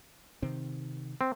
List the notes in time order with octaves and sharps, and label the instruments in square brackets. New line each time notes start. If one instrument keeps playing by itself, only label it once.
[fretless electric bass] C3 D#3 C4
[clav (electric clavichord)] C4